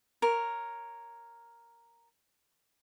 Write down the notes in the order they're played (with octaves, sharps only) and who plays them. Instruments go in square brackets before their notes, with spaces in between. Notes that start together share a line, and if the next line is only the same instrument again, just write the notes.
[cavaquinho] A#4 C#5